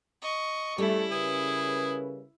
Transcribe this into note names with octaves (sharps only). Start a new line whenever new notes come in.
D#5 C#6
G3 A3 C#4 E4 A4
C#3 G#4 A#4 B4